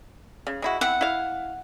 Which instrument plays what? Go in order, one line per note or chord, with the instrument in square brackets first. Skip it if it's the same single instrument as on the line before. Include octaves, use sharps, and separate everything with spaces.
[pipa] C#3
G#3 E4 F#4
[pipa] B3 C4 E4 [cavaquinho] F#5
[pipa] E4 F5